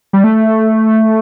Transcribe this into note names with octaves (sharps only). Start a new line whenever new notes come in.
G3
A3